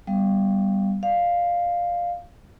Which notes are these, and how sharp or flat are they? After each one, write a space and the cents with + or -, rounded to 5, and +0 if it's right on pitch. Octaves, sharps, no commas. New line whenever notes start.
G3 +0 B3 +0 F5 -10
D5 +20 F5 +0